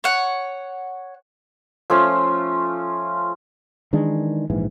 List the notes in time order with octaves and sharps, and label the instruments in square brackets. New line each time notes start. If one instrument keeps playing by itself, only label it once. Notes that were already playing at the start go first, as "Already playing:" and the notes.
[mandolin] C#5 F#5
[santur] F3 A3 C#4 F4
[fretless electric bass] D#3 E3 G#3 D4
A#1 G#2 E3